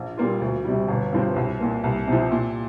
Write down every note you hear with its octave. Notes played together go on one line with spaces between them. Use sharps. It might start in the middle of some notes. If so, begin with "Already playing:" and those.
Already playing: A#1
A#2 G3 A#3 F4
D2
C3 G3
G1
G2 F3 C4
C2
A#2 A#3
C2
C3 F3
A#2